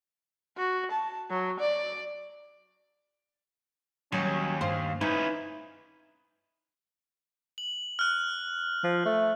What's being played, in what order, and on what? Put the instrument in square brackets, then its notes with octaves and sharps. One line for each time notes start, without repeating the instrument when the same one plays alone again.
[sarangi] F#4
A5
F#3
D5
[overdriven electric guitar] D#2 [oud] F#3 [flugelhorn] C#4
[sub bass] G2 [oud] C5 [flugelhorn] F5
[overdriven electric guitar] C#4 E4 [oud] D#4 [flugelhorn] B4
[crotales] F#7
F6 F#6
[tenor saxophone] F3
A3